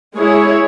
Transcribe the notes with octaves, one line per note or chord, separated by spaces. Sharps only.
G#3 E4 G#4 C#5